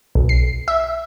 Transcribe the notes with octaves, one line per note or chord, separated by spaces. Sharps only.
B1
C7
E5